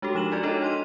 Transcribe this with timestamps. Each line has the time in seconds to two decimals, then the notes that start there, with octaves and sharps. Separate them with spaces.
0.02 G#3 D4 F#4 G4 A4
0.15 F3 D#4 E7 F#7
0.32 D#4 F4 F#4 D5
0.43 D4 F#4 A4 C#5 D#5
0.62 D#4 C6 D#7